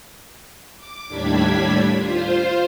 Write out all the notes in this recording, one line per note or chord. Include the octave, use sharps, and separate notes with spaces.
D6
D#2 A2 G3 D4 G#6 B6
F4 C5